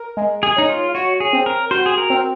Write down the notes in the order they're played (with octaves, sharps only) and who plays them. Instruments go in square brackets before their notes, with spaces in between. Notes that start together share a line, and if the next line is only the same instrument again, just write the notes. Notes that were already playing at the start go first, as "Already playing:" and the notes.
Already playing: [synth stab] A#4
G#3
[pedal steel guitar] G#4
[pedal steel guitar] D#4 [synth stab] C#5
[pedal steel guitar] F4
[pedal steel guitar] F#4 [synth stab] C#5
[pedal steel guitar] G#4
[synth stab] C4
[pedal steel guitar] A#4
[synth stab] F#4 [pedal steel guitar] C5
[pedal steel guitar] G#4
A#4
[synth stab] C4